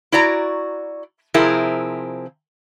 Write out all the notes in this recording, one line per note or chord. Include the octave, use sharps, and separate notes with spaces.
E4 F#4 D5 A#5
C3 F3 C4 E4 G#4 A#4